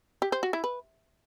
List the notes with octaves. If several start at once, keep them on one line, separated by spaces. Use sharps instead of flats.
G4
C5
F#4
E4
B4